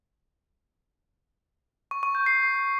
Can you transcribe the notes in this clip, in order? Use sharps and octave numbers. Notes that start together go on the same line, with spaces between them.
C#6
C#6
G6
C7